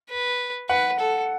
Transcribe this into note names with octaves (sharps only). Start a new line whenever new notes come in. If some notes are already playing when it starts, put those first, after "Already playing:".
B4
B4 F#5
A4